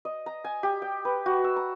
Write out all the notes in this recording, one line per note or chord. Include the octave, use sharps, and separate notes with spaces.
D#5
A#5
G#5
G4
G5
B4
F#4
E6
A#5